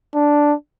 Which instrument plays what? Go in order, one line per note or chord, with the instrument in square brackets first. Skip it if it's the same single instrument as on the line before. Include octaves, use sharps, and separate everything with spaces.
[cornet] D4